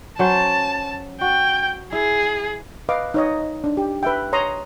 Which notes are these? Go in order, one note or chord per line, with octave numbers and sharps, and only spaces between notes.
F#3 C#4 C5 A5
F#4 G5
E4 G#4
B4 D#5 F5 D6
D#4 C#5 D#5
D4
G4
B4 E5 G5
C#5 A#5 C6 D#6